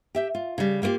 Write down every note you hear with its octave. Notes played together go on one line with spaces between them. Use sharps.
G4 E5 G5
F4
C#3 G3
G3 A#3 B3 F4 G4